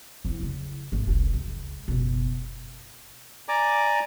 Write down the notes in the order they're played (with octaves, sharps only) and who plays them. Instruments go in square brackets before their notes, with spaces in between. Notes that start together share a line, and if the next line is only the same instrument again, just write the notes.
[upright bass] F2 E4
C#3
G#1 A3
F1 C2
C#2
F#1 B2
[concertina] D5 G#5 A#5 D6